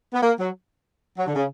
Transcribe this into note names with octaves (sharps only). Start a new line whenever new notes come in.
B3
A#3
F#3
F#3
D3
C#3